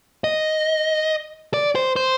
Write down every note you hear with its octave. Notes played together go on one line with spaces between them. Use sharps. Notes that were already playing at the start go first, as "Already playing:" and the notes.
D#5
D5
C5
C5